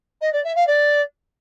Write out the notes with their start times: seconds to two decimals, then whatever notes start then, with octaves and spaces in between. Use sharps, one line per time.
0.21 D#5
0.32 D5
0.44 E5
0.55 F5
0.67 D5